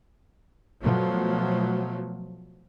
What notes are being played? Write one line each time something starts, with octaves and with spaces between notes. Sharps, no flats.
B2 F3 F#3 A3